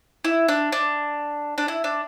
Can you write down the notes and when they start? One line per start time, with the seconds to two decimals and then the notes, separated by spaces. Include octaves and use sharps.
0.24 E4
0.48 D4
0.72 D4
1.58 D4
1.68 E4
1.84 D4